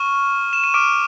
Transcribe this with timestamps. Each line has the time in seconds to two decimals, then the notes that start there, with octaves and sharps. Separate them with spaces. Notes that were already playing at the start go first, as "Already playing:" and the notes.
Already playing: C#6 F6 D#7
0.53 E7
0.64 D#7
0.74 D6 F6 D7